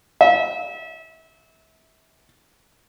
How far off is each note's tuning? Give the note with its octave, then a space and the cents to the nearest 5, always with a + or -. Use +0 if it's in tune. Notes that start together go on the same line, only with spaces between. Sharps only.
E5 -30